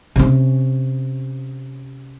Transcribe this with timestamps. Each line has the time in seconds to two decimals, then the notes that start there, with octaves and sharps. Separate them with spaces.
0.16 C3 C#4